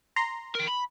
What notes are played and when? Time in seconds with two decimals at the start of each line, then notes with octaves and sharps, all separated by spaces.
0.16 A#5 C6
0.55 A#4 G5
0.67 B5